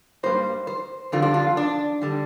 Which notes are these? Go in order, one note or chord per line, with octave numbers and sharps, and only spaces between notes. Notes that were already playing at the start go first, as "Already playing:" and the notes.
G2 G3 A#3 C5
C5
F2 D3 G3 F4
D4
F4
D4
D3 G3